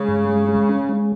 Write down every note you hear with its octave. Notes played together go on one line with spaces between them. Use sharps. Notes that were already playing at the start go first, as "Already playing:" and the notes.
Already playing: C#3 G#3
G2
G#3
G#3
C#4
G#3